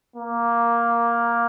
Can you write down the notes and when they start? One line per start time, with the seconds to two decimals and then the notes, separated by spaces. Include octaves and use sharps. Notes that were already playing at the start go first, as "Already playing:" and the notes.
0.16 A#3